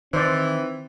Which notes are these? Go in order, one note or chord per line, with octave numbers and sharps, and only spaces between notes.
D#3 E3 C4 C5 D5